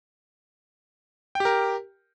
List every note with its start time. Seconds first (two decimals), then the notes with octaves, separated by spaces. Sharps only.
1.35 G5
1.40 G4
1.45 A#4